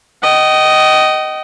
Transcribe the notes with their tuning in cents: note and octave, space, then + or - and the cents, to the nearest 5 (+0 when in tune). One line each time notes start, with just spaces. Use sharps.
D#5 +0 G5 -40